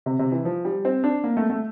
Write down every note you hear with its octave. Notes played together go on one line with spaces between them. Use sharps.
C3
C3
E3
F3
G3
C4
D4
A#3
A3
A3